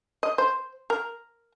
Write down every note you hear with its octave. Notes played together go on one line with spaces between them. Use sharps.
D#5
C5
A#4